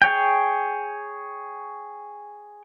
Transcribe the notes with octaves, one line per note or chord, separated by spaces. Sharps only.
G#4 C#5 G5